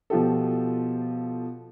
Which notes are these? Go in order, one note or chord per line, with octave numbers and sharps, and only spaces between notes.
B2 F3 F4 G4 A4